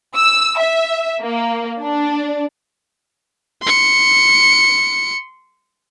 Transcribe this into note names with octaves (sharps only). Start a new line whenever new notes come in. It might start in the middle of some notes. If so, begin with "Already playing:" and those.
E6
E5
A#3
D4
C6 C#7